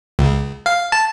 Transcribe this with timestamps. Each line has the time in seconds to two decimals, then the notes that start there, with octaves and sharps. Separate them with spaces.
0.19 C#2
0.66 F5
0.92 A5